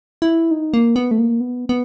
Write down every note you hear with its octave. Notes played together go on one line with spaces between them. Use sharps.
E4
D#4
A#3
B3
A3
A#3
B3
B3